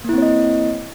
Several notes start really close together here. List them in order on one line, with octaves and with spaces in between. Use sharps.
A#3 E4 C4 C#5 D#5